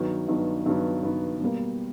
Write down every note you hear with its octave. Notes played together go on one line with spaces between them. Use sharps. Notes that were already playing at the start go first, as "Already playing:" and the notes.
Already playing: G2 D#3 F#3 B3
G2 D#3 F#3 B3
G2 D#3 F#3 B3
G2 D#3 F#3 B3
B2 G3 A#3